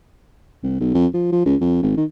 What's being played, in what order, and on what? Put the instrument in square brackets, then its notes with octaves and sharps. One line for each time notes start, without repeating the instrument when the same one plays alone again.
[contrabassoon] C2
B1
F2
F3
F3
C#2
F2
G#1
D#3